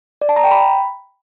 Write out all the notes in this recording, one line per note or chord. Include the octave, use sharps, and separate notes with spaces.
D5
A5
A#5
G5
B5